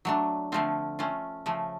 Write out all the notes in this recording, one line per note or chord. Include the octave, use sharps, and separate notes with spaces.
F#3 A3 D4
D3 F3 A3 C4 F4
A3 C#4 F4
C#3 F3 A3